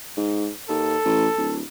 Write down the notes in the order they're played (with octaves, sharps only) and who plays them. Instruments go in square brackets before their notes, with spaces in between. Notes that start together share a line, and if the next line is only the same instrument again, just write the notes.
[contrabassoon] G#2
[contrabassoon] D#2 [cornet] A4
[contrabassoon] A1
D1